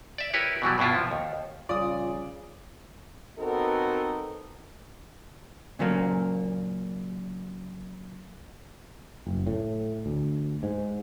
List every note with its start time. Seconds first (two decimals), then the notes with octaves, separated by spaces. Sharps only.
0.18 D5 E5
0.33 E4 G4 A#4 B4 C#5
0.62 B2 E3 F#3 G3
0.78 G2 B2 D4 E4 F4
0.95 F3
1.11 D#2
1.69 A#1 C#3 G3 F4 D5 D#6
3.38 B3 C4 D#4 F#4 A4 A#4
5.79 A#2 C#3 F#3 A#3
9.27 F#1
9.47 A2
10.06 D2
10.63 G#2